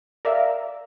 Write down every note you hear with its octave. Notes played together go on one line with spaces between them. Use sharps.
A#4 D5 E5 F5